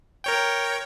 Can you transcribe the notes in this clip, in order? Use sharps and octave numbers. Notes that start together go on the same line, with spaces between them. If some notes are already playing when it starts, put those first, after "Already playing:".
A#4 C#5 G5